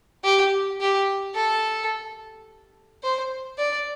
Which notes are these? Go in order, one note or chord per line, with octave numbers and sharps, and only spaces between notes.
G4
G4
A4
C5
D5